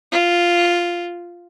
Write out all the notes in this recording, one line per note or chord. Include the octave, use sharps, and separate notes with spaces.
F4